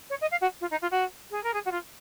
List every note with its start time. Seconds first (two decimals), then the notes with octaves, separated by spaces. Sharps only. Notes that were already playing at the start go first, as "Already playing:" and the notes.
0.10 C#5
0.21 D#5
0.31 F5
0.41 F#4
0.61 F4
0.71 D#4
0.82 F4
0.91 F#4
1.31 G#4
1.44 A#4
1.54 G#4
1.66 F#4
1.71 F4